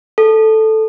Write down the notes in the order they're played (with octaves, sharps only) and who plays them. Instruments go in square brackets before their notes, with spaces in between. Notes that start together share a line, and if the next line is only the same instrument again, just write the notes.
[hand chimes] A4